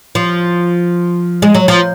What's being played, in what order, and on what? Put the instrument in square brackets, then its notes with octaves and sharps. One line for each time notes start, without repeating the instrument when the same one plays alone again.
[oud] F3
G#3
F#3
F3